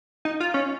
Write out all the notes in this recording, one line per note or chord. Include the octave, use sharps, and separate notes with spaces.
D#4
F4
C#4